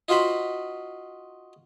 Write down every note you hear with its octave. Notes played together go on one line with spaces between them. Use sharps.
D#4 F4 F#4 C5 B5